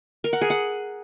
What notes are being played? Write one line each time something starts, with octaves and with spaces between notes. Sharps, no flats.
A#4
F#5
G#4
F#5